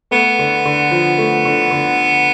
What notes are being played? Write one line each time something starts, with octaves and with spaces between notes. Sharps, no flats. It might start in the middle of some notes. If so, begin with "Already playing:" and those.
A3 B3
D3
D3
F3
A3
D3
D3